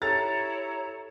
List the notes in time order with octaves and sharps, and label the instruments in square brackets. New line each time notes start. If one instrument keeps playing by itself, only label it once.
[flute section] E4 C#5 [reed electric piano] G4 A4 [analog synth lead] A#5 [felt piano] A6